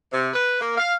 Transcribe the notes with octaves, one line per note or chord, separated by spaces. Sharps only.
C3
B4
A#3
F5